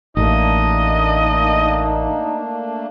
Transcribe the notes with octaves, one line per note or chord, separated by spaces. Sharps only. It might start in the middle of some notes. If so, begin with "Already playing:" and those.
A1 A3 A#3 D4 D#4 D#5